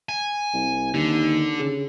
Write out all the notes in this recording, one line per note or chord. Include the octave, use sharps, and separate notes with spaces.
G#5
C2
D#2 D3
C#3